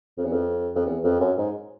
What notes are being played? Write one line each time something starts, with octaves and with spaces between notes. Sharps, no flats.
F2
E2
F2
F2
E2
F2
F#2
G#2